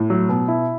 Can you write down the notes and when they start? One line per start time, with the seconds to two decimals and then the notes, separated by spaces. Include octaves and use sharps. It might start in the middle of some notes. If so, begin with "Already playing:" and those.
Already playing: A2
0.10 F#3
0.29 B2
0.48 E4